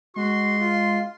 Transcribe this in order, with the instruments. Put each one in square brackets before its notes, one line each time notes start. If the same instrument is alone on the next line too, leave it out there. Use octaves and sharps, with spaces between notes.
[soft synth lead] G#3 [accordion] F#4 [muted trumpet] C6
[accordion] F4